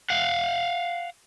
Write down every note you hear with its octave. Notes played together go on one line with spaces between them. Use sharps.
F5 F#5